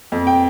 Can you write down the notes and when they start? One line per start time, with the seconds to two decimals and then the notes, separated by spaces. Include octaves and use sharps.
0.12 F2
0.27 G5